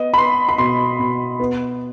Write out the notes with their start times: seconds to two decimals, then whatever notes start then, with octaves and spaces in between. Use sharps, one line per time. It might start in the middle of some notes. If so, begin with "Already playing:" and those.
Already playing: B3 D#5
0.14 B5
0.17 B3 C6
0.49 B5
0.58 B2 C6
0.99 B2
1.39 B3